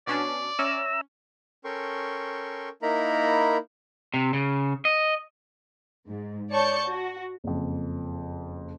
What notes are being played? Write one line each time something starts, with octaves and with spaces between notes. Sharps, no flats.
B2 C#4 D4 D5
C#4 E5 A#5 E6
C#4 A4 A#4 G5 C6 C#6
A#3 D#4 E4 A#4 A#5 B5
C3
C#3
D#5
G#2
C#5 D5 A5 C#6 G6 C#7
F#4
F#1 F2